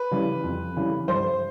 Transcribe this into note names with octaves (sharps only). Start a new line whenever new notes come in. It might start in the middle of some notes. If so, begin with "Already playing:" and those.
Already playing: B4
C#3 E3 G3
F2
C#3 E3 G3
G2 C5